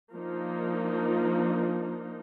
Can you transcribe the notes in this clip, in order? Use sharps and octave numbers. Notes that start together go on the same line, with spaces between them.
F3 A#3 D4 D#4